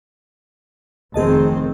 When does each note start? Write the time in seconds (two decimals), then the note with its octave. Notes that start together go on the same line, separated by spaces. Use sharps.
1.14 F1 D#3 C4 G#4 D#5 A5